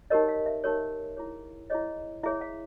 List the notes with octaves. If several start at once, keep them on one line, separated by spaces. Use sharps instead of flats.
D#4 G4 A#4 C#5 D#5
F5
E5
D#4 G4 A#4 C#5
E4 G#4 C#5
E4 G#4 C#5 D#5
E4 G#4 C#5 E5
F5